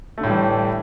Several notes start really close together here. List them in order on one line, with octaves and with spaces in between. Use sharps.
A3 D3 A2 G3 E3